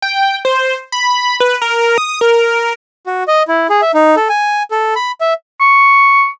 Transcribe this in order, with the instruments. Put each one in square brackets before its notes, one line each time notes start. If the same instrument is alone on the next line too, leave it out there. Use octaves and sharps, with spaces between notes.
[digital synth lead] G5
C5
B5
B4
A#4
D#6
A#4
[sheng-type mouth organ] F#4
D#5
E4
G#4
E5
D#4
A4
G#5
A4
B5
E5
[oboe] C#6